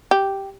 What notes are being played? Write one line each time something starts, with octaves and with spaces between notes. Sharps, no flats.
G4